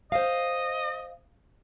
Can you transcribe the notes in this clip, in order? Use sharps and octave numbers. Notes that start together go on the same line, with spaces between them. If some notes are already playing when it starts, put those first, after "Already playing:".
C5 D#5 F5